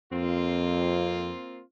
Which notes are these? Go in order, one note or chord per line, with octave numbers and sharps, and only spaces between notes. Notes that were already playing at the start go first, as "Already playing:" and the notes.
F2 A#3 C4 F4